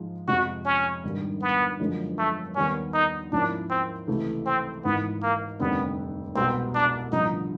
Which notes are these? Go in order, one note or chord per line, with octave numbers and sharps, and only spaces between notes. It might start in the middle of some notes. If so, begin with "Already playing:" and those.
Already playing: G#2 F3 G#3
F2 C3 F3 G#3 F#4
C#4
G#1 G2 D#3 G3
B3
G1 F#2 D3 F3 G#3
A3
D#2 D#3 G3 B3 C#4
D#4
G#2 F3 A#3 C#4 D4 E4
C4
C#2 C3 E3 A3
C4
G#1 G#2 E3 B3
A#3
F1 D#2 D3 G3 B3 C4
C2 B2 G#3 B3 C4
D4
A1 G2 D3 F3 D#4